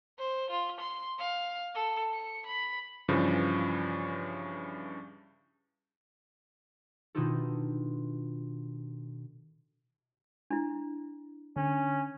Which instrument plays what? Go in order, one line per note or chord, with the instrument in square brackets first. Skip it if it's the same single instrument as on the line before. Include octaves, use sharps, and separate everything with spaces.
[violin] C5
F4
C6
F5
A4
C#7
B5
[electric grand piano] G2 C#3 E3 F3
[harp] B2 D#3 D4 D#4 F4 A4
[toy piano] D4 E4
[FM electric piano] D3 [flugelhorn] C#4